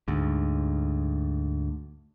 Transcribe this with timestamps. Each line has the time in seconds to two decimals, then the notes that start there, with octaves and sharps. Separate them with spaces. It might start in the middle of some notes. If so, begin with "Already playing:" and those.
0.08 D2 G#2